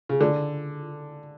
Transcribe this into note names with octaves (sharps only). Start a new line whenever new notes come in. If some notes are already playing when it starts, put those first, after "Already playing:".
C#3
D3